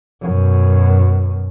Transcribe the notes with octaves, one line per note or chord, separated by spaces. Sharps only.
F#2 B2